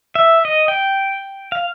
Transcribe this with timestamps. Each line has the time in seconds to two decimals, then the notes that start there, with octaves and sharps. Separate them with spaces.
0.15 E5
0.45 D#5
0.68 G5
1.52 F5